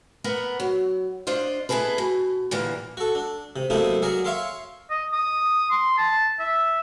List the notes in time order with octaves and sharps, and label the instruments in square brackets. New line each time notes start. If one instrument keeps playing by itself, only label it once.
[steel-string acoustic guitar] B3 A#4 F#5
F#3
D4 F4 C5 D#5
B3 E4 F#4 G#4 A4 B4
B2
A#2 D3 E3 G3 A#3
[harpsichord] F#4 A4
D4
C3
F#2 C3 A3 A#3 D#4 E4
F#3 G#4 A#4 D5
C#5 E5 F5 C6 D6
[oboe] D#5
D#6
C6
A5
E5